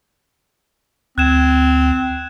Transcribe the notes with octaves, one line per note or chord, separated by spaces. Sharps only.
D2 C4 F#6 G#6 E7